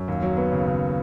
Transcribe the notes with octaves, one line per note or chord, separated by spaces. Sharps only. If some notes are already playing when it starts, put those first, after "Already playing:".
Already playing: F#2
D#2
F#3
B3
C#3
C#3